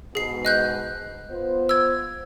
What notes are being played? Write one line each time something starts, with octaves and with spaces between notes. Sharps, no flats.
G#2 B2 G#4 C7
D#5 F#6 G6
B3 F4 C5
E6 G#6